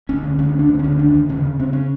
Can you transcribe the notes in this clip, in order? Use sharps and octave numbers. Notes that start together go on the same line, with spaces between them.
D2 C#4
D3
D2 C#4
D2
D4
D3 C4
C#4
D2
D#2 D4
D#2
C#3 C#4
C#3
C#3 C4
C#4